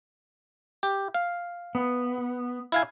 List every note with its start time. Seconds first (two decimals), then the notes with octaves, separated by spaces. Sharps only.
0.83 G4
1.14 F5
1.75 B3
2.72 E4 F5 G#5